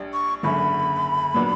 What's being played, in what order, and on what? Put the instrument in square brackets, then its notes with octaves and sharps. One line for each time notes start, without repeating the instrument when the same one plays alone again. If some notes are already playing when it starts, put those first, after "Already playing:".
Already playing: [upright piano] A#1 G3 D4
[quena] C#6
[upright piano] F#1 F#2 D3 [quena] B5
[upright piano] A#2 F#3 B3 D4